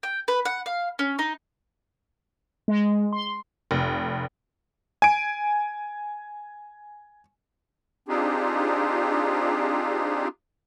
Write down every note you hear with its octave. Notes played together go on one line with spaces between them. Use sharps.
G5
B4
F#5
F5
C#4
D#4
G#3
C6
F1
G#5 D7
C4 D4 D#4 F4 G4 G#4